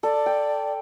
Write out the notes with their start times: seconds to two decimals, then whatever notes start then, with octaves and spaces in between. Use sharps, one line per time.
0.03 A4 D5
0.26 G5